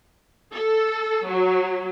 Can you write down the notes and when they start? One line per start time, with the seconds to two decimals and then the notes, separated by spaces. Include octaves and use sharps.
0.51 A4
1.25 F#3